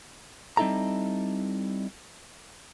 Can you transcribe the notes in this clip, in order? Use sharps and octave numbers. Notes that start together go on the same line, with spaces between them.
G3 C4 D#4 E4 A4 A#5